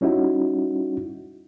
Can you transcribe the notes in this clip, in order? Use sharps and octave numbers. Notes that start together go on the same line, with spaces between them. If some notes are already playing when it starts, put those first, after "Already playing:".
G3 C#4 D#4 E4 F#4